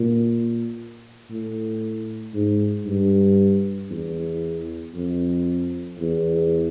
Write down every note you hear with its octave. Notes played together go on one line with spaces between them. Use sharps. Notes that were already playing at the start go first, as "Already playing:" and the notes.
Already playing: A#2
A2
G#2
G2
E2
F2
E2